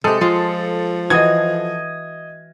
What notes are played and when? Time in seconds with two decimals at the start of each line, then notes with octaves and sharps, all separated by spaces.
0.04 C3 G#3 G4 A4
0.21 F3 G#3 F4
1.10 E3 F#4 D#5 D#6 G#6